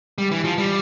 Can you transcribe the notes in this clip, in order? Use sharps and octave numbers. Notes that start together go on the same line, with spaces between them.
G3
E3
F3
G3